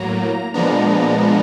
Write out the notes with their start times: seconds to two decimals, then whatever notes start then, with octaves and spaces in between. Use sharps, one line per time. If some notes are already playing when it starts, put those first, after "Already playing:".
Already playing: A2 F#3 A#3 A#5
0.54 A#2 F3 G#3 B3 D4 A#5